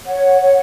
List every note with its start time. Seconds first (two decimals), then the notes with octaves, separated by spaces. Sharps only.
0.05 C#5 F#5
0.42 C#5